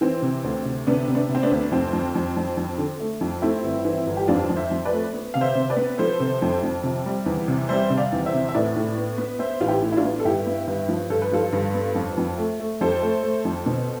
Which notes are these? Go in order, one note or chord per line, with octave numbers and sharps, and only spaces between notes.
E3 C4
C3
D2
C3
C3 B3 D4
C3
B3 D4
C3
C4
B3 D4
D2
F2 C4
F2
F2
F2
F2
D3
A3
F2
A3 C4 E4
G1
E3
G1
G4
F2 D4 F4
F2
C5 E5
F2
B4 D5
A3
B3
C3 F5
C5 E5
C3
B4 D5
B3
F3 A4 C5
C3
F2
F2
C3
G3
E2
C3
G3 C5 E5
C3
D5 F5
E2
C5 E5
C3
E5
A2 B4 D5
A2
B3
B3
B3 C5 E5
A1 F4
E4 G4
A2
E4
D4 F4
B3
A4
G2 E4 G4
B3
G2
F3
G2 A4
B4
F3 F4 A4
G2
B3
F2
F2
A3
A3
F2 A4 C5
A3
A3
F2
B2